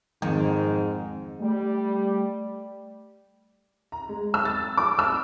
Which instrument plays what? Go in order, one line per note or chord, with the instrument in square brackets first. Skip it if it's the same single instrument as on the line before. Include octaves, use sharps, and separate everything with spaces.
[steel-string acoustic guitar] F2 [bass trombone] G#2 [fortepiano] D#3
[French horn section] G3 [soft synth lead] A3
[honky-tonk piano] A#5
G#3
E6
A6
D6
E6